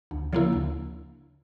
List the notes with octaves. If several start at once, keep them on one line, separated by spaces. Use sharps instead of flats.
D2
C#3 F3 A#3 E4
D2